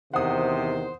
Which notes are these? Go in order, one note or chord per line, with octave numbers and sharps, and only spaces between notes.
E2 C3 D#3 C5 F#5 D#6